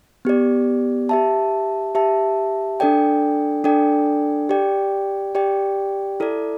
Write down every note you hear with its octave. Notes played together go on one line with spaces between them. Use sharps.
B3 G4 D5
G4 E5 A5
G4 E5 A5
D4 A4 D5 G5
D4 A4 D5 G5
G4 D5 G5
G4 D5 G5
E4 A4 D5